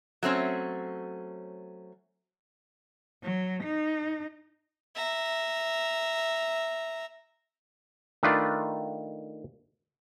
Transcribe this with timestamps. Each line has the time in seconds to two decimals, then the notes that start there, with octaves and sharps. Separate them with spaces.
0.23 F#3 A3 C4 C#4
3.23 F#3
3.64 D#4
4.95 E5 A#5
8.23 D#3 A3 D4 F4 B4 D5